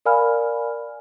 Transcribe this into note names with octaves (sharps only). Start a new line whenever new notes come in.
A#4 D5 F5 G#5 B5 F6